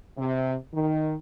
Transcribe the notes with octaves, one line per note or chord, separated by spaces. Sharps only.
C3
D#3